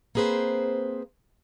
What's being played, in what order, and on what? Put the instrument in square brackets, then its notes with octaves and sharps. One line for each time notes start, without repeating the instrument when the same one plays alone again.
[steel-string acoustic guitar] A#3 C4 G#4 B4 C5